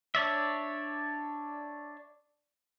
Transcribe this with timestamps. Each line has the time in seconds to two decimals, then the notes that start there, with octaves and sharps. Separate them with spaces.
0.15 D4 C#5 D5 E5